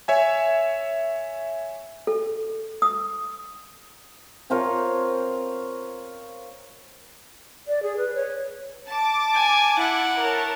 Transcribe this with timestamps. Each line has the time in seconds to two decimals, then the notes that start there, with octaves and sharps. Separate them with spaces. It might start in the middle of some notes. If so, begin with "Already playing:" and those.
0.08 C#5 E5 G#5
2.07 A4
2.82 D#6
4.50 C4 F4 A#4 C#5
7.68 D5
7.83 G#4
7.97 B4
8.15 C#5
8.89 A5 D6
9.34 G#5
9.78 E4 F#5
10.18 A#4 C#5 A5